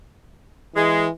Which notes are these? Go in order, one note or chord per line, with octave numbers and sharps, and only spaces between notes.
E3 G#3